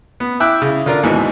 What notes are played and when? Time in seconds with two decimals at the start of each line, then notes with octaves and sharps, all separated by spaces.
0.20 B3
0.40 E4 E5 G5 D6 E6 F#6
0.62 C#3 E4
0.86 D3 F4 A#4 D5
1.03 D#2 G#2 B2 E3